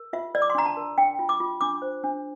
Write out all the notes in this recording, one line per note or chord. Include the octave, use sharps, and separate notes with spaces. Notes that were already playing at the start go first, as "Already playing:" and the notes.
Already playing: A#4
F4 E5
A#4 D5
D6
C6
D4 A#5
A5
A#4
D4 G5
F4
D6
F4
D4 D6
C5
D4